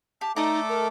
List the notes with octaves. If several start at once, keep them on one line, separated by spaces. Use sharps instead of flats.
G4 A5
A3 D#4 A4 D5 D#5 A#5 D6
A#4